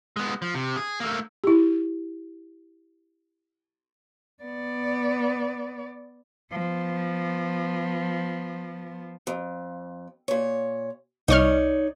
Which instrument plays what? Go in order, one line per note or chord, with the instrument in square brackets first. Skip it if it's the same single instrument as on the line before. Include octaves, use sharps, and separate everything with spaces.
[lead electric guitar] G#3 B3
F3
C3
G#4
A3 A#3
[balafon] E4 G4
[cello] B3 D5
F3 B3
[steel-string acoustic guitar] F2
A#2 C#5
[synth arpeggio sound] C2 C#6 F6 [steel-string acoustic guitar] D#4 C#5 D5